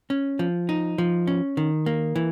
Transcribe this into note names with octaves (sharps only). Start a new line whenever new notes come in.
C#4
F3
D#4
F3
C#4
D#3
A#3
E3